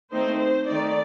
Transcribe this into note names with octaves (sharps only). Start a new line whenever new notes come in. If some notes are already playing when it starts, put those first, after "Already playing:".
D#3 A3 C4 D#4 C5
C5
D#3 A3 D#4 D5